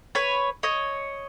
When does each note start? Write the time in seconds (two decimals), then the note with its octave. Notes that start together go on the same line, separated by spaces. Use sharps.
0.15 B4 C#5
0.63 C#5 D#5